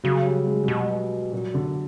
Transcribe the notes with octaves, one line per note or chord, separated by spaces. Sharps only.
C#3 F#3
G3
G#3
F#3
B2 G3
A#2 F#3
D3